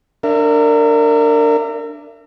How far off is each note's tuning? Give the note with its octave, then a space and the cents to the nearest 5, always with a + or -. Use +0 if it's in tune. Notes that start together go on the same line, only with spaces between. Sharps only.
D4 +0 A#4 -25 E5 +25